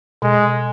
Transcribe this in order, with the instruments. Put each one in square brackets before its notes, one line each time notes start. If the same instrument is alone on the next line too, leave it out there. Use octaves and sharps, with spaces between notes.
[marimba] B2 [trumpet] G#3